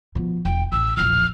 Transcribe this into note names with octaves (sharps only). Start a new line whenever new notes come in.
B2 F3
E1 G5
A1 E6
E1 A#1 F6